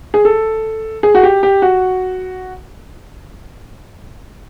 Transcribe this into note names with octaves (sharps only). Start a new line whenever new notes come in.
G#4
A4
G#4
F#4
G4
G4
F#4